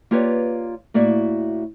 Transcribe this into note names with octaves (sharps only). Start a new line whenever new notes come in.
A#3 F4 G4 B4 C#5 D5
A2 A#3 F#4 D5 E5